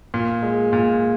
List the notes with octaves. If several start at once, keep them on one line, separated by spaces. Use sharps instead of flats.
A#2
G#3
A#2